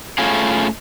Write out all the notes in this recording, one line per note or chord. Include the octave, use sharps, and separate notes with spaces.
A3 C#4 E4 F4 G#4